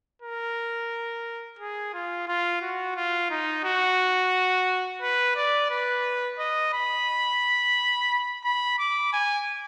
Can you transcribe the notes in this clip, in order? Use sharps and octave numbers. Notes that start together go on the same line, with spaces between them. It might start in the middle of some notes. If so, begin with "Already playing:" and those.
A#4
G#4
F4
F4
F#4
F4
D#4
F#4
B4
D5
B4
D#5
B5
B5
D6
G#5